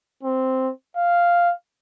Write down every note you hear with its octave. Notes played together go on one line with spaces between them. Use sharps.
C4
F5